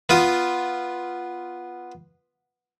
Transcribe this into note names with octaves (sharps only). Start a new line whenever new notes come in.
B3 F4 D#6